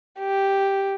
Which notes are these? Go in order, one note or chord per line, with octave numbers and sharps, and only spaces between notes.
G4